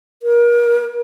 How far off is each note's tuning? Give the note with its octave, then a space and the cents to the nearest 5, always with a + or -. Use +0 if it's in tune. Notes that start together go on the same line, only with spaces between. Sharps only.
A#4 +30